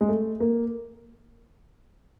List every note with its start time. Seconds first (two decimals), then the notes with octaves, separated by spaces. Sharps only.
0.01 G#3
0.09 A3
0.40 A#3